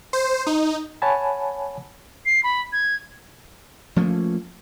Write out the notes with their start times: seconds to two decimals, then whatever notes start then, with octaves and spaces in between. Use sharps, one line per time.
0.13 C5
0.47 D#4
1.02 C#5 F#5 G#5 A5 B5
2.26 C7
2.43 B5
2.73 G#6
3.96 F3 A3 A#3 C#4